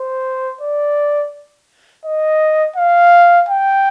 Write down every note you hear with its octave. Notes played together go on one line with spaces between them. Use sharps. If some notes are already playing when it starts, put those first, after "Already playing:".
Already playing: C5
D5
D#5
F5
G5